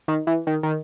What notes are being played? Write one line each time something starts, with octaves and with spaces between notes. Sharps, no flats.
D#3
E3
D#3
D#3